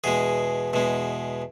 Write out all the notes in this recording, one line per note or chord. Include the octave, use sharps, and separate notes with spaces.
E2 B2 G#3 G#4
E2 B2 G#3